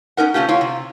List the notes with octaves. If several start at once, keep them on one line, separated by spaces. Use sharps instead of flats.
C#4 D#4 A#4 F#5
C3 A3 C#4 F4 G4
E4 F4 C#5
C3